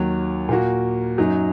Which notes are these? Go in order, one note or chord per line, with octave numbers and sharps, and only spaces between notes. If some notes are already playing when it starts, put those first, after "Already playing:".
Already playing: D#2 D#3 F#3
A#2 A#3 F#4
F#2 F#3 D#4